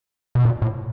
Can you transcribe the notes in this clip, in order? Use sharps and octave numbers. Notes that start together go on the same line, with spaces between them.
B2
A#2
A2